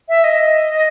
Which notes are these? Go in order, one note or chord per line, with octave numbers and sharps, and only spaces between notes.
E5
D#5